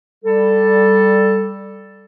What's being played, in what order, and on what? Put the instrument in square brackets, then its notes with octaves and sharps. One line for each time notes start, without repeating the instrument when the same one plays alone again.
[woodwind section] G3 A4